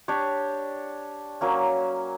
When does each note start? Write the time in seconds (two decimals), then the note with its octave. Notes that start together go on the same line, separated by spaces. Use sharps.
0.08 D4 G4 C#5
1.41 F#3 A#3 C#4